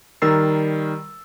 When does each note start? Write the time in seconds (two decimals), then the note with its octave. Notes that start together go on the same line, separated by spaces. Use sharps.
0.22 D#3 G3 A#4 E6 A6 C7